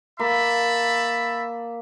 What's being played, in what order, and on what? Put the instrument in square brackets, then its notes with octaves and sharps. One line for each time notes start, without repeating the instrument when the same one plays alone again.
[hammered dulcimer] A#3 [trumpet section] E5 A5 B5